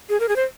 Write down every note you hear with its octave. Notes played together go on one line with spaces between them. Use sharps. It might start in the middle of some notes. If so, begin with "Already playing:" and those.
G#4
A#4
G#4
C5